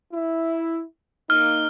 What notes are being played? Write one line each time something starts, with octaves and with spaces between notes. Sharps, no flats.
E4
A#3 D#4 F6